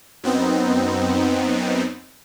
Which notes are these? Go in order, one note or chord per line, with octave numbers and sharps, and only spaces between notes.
F#2 B3 C4 D#4